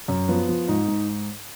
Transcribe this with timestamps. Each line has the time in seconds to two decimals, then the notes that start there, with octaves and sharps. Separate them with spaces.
0.08 F#2
0.28 F3 B3
0.49 F3
0.68 G#2 D#4
0.88 G#2